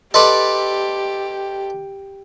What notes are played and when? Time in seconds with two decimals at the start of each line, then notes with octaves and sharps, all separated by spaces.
0.14 G4 A4 B4 D5 D#5 C6